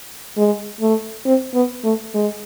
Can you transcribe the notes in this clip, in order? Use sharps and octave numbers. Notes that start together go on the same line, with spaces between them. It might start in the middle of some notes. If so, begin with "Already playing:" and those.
G#3
A3
C4
B3
A3
G#3